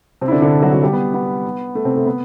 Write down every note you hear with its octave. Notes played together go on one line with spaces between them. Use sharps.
C3 C4
E4
D3 D4
D3 D4
F#3 F#4
F#3 F#4
G3 G4
B3
B3
A3
C3 C4
A3
B3